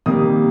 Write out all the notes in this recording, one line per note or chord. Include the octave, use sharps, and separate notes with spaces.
C3 D#3 G3 A#3 D#6